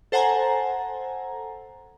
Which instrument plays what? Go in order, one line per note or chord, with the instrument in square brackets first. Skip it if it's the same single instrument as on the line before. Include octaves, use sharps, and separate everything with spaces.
[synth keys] A4 C5 F#5 G#5 A#5